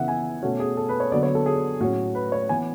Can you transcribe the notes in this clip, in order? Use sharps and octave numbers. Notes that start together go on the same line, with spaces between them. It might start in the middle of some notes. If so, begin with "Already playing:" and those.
Already playing: C#3 E3 B3 E5 F#5
G#5
B2 A3 C#4 F#4
G#4
A4
B4
C#5
D3 F#3 B3 D5
C#5
A4
G#4
A2 F#3 A3 C#4 F#4
B4
C#5
E3 B3 G#5